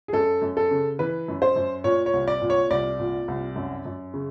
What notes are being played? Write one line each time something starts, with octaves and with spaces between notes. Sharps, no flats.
G#4
F#2 A4
F#2
A4
C#3
E3 B4
F#2
C5
F#2
A#2 C#5
C#5
C2
D5
A#2
C#5
C2 D5
A#2
C2
F#2
F#2
C#3